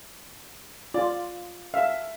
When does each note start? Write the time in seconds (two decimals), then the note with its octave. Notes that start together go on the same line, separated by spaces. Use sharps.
0.94 F4 D5
1.74 E5 F5